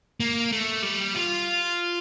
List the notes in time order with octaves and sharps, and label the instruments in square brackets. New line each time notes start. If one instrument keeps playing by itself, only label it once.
[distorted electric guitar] A#3
A3
G3
F4